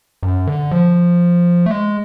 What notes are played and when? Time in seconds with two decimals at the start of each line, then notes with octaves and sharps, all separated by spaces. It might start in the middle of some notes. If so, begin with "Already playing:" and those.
0.23 F#2
0.47 D3
0.71 F3
1.66 A3
1.71 G#3